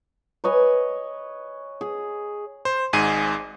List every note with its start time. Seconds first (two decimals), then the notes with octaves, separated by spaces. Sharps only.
0.44 B4 C#5 D#5 G#5
1.81 G#4
2.65 C5
2.93 G#1 G#2 G#4 D#7